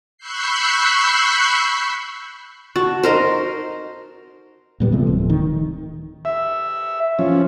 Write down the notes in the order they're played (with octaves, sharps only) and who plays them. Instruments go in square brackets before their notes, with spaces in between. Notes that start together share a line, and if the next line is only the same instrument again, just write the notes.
[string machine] B5 C#6 E6 F#6 G6 C7
[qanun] F#4 A5
D#4 A#4 C5
[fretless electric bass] A#2 G3 B3
C3 F3 A3
D1
D#3
[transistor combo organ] E5
F3 C#4